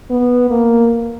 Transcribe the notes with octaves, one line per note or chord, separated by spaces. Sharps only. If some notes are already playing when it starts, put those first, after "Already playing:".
B3
A#3